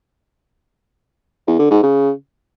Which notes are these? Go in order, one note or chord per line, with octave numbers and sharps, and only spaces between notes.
E2
D3
G#2
C#3